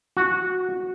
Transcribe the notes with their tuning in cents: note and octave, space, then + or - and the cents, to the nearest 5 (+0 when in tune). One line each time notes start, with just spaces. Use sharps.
F#4 -10